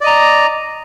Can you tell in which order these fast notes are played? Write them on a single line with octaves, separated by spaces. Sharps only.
D5 D#5 A#5